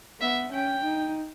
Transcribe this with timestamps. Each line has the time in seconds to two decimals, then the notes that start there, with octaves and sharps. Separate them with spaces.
0.21 B3 E5
0.53 C#4 G5
0.84 D#4